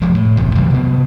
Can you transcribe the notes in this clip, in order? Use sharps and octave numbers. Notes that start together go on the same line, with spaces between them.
F1 D#2 F3 G#3
A2
F#1 B1 E2
C3 E3 F#3 G3
C3 B3